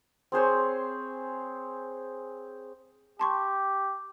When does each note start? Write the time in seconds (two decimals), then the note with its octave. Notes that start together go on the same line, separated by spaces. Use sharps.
0.32 C4 G#4 C5 C#5
3.19 G4 A5 C6 C#6